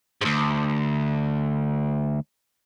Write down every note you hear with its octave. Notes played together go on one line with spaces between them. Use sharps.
D2 G#2